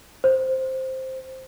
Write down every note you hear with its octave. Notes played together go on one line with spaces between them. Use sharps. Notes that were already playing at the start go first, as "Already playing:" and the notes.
C5